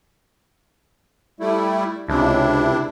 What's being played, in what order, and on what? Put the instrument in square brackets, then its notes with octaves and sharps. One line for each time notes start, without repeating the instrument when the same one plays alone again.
[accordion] G3 A3 E4
[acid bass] C#2 [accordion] C3 D4 E4